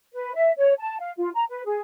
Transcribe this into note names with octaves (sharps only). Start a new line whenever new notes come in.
B4
E5
C#5
A5
F5
F4
A#5
B4
G#4